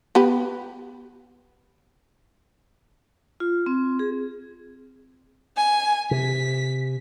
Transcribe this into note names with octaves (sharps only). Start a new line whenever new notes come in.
B3 G4 B4
F4
C4
G#4
G#5
C3 B6